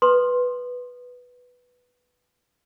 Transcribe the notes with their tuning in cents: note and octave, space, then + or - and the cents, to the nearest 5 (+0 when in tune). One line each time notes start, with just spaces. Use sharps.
B4 +0 C6 +15 D#6 -20